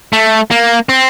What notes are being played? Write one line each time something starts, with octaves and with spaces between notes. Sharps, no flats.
A3
A#3
C4